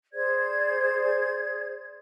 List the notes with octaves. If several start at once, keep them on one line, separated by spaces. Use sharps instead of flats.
G#4 C5 D5 G#6